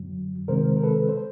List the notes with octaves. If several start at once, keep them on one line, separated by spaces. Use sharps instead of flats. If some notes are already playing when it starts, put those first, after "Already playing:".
Already playing: F#2 D3 F#3
C3 D#3 G#3 C4 A#4 C5
A#4
A4 B4
C5